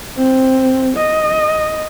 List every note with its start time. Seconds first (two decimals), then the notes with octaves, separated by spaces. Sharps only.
0.17 C4
0.98 D#5